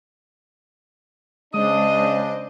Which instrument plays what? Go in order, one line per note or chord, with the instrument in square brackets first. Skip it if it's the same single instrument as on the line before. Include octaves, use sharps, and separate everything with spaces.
[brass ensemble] C#3 D4 [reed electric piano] G#3 [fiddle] C5 D#5 [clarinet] D#6